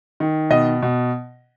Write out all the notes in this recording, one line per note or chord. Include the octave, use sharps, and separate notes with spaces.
D#3
B2 D#5
B2